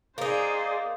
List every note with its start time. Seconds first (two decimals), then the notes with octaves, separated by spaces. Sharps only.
0.18 A#3 D#4 G#4 C5 D5